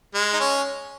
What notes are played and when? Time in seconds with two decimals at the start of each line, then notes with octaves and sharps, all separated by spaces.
0.15 G#3
0.33 D#4
0.40 C#4